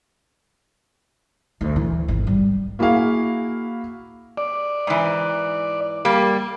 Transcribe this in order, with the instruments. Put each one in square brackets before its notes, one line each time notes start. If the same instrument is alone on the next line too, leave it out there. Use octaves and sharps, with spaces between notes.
[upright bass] D2
E3
G#1
G3
[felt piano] A#3 E4 F#4 G#4 F5
[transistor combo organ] D5
[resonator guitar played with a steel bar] G#2 E3
G3 A#3